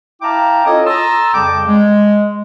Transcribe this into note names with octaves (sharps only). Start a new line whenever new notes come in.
E4 F5 G5 A5 A#5 D6
C#4 F4 A4 C#5 D#5
A5 A#5 C6 D#6 E6
F2 C#3 G3 G5 A5 D6
G#3